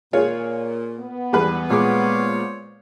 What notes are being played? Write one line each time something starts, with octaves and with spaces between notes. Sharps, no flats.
A#2 F4 G#4 C#5
B3
E2 G3 G#4 B4
A#2 G#3 C5 C#5 F5 D6